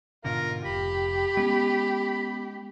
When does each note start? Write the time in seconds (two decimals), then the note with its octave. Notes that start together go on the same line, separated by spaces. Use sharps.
0.25 G#2 B2 D3 F4 A#4
0.65 F1 G4 B5
1.37 G#3 B3 C#4